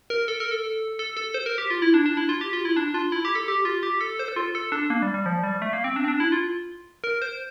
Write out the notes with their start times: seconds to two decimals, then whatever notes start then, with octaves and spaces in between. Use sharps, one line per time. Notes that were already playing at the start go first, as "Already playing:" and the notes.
0.10 A#4
0.28 A4
0.40 A#4
0.51 A4
0.99 A4
1.17 A4
1.34 C5
1.46 A#4
1.58 G4
1.70 F4
1.82 E4
1.94 D4
2.06 D4
2.17 E4
2.29 F4
2.41 G4
2.53 F4
2.65 E4
2.76 D4
2.94 F4
3.12 E4
3.25 G4
3.35 A4
3.48 G4
3.65 F4
3.83 G4
4.01 A4
4.19 C5
4.28 A4
4.36 F4
4.55 A4
4.72 D4
4.90 A#3
5.02 G3
5.14 G3
5.26 F3
5.43 G3
5.62 A3
5.73 A#3
5.84 C4
5.96 D4
6.04 C4
6.08 D4
6.20 E4
6.32 F4
7.04 A#4
7.22 C5